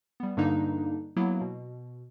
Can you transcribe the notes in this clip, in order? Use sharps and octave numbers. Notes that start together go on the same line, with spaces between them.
G3 B3
G2 D3 G3 A#3 D4 D#4
F#3 A#3 B3 E4
B2